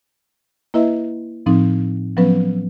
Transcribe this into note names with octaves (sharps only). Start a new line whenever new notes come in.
A#3 E4 B4 D#5 E5
A2 F3 C4 D#4
F3 F#3 B3 C#4 B4